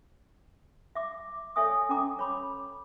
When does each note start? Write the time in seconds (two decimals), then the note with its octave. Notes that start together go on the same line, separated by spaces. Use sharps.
0.95 E5 D6
1.56 A4 C#5 D5 E5 G#5 D#6
1.89 C#4 A4 G5 A#5 D6
2.19 C#5 B5 D6